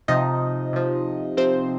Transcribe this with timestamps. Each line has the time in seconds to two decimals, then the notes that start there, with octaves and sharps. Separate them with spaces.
0.08 C3 F3 D#4 D#5
0.73 C3 F3
1.37 C3 F3 C4 C5